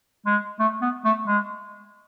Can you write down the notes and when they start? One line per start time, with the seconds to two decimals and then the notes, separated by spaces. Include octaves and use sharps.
0.26 G#3
0.60 A3
0.82 B3
1.05 A3
1.27 G#3